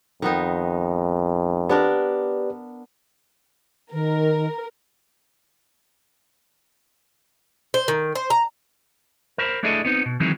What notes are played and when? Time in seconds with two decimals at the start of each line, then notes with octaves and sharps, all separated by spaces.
0.22 F2 D#3 B3 D#4
1.69 B3 D4 G4 A#4 B4 D5
3.93 D#3 A#4
7.74 C5
7.88 D#3
8.15 C5
8.30 A#5
9.38 A#4 C5 B5
9.63 A3 D4 E4 G#4 A4 D#5
9.85 B3 C4 D#4
10.06 B2
10.20 D#3 E3 F#3 G#3 C4 D#4